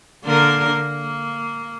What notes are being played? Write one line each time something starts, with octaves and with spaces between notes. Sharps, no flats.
D3 A#3 A#4
A#3